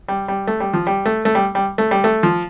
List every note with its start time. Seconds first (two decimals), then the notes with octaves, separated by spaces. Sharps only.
0.08 G3
0.28 G3
0.47 A3
0.60 G3
0.73 F3
0.87 G3
1.06 A3
1.25 A3
1.35 G3
1.55 G3
1.78 A3
1.91 G3
2.04 A3
2.23 F3